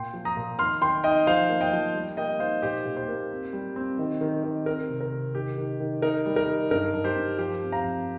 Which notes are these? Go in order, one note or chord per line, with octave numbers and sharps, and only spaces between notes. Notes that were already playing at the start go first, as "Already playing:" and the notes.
Already playing: A#2 G5 C6
F3
A#5 D#6
A#2
D#3 C6 F6
D#3 G5 C6
D#4 D#5 G5
F3 C5 F5
A#3
D#5 G5
F3
G3
A#3 D#5 G5
D#4 C5 F5
A#2 G4 C5
A#2
G4 C5
A#3
C4
G3
C4
D#3
D#3
D#3
C4 A#4
C3
A#4
C3
D#3 G4
D#3
D#3
D#4 A#4
G3
A#4
D#4
G2 A#4
G2
G4 C5
G2
F3 G4 C5
C4
F5 A#5
F2